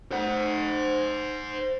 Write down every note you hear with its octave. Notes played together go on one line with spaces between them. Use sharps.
C5 F#5